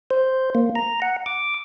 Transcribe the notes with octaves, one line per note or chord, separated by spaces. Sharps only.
C5
A#3
A#5
F#5
D6